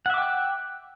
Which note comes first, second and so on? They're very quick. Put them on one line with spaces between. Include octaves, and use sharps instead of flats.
F#5 E5 D6 G5 F#6